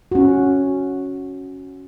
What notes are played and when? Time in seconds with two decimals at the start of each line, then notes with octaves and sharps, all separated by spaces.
0.12 C#4 F#4